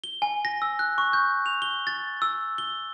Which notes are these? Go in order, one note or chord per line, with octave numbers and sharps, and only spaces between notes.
G7
G#5
A#6
E6
F#6
C#6
G6
F7
G7
A6
E6
G7